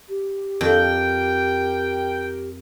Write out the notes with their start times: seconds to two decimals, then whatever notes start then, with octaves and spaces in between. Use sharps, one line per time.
0.09 G4
0.61 F2 A#4 G5